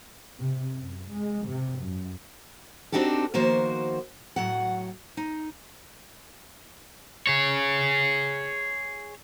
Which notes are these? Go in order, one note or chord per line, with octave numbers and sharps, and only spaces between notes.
C3
F#2
G#3
C3
F#2
C4 D4 D#4 F#4 G4 A4
D#3 F3 A#3 F#4 C5
A2 F#3 F#5
D#4
G#4 C#5